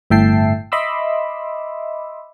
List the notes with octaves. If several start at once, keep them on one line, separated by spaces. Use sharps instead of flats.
G1 A2 E5 G5 A5 C7
D#5 E5 B5 C6 D6 E6